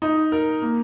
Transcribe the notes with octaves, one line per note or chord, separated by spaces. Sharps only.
D#4
A#4
A#3